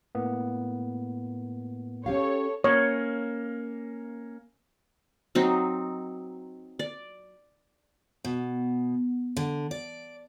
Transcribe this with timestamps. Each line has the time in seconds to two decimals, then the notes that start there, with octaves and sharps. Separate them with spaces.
0.15 A2 A#3 B3
2.06 C#4 G4 A4 C#5 F5
2.64 A#3 C#4 C#5
5.35 F#3 C4 D#4
6.79 D5
8.25 B2
9.37 D3
9.71 D5